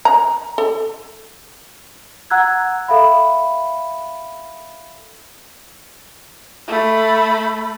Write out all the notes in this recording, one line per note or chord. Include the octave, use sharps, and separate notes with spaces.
A#5
A4
F#5 A#5 E6 F#6 G#6
A4 E5 F5 B5
A3 B5